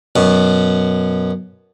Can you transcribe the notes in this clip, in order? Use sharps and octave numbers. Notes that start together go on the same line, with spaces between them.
F#2 B2